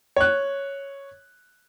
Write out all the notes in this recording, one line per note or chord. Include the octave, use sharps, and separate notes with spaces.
C#5 F#6